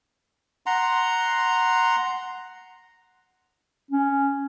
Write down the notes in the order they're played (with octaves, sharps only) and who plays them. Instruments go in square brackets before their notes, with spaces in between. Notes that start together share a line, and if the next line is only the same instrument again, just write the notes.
[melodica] F#5 A#5 C6
[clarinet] C#4